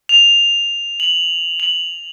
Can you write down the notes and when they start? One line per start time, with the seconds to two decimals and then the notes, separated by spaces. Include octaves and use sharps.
0.09 F7
1.00 F#7
1.60 F#7